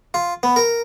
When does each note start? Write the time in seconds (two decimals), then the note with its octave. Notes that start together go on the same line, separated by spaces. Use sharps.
0.14 F4
0.43 B3
0.56 A#4